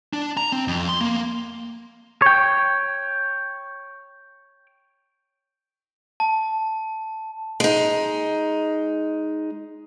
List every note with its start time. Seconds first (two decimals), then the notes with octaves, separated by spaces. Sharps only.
0.13 D4
0.37 A#5
0.52 C4
0.68 F2
0.89 C6
1.01 A#3
2.22 C#5 G5
6.20 A5
7.60 G#3 D#4